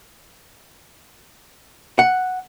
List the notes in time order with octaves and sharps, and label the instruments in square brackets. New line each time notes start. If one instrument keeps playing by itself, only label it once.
[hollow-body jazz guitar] F#5